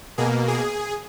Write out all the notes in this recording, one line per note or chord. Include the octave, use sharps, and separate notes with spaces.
B2 A#3 G#4
G#4